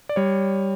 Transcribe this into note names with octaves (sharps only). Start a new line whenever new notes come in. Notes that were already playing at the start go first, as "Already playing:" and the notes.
D5
G3 C#5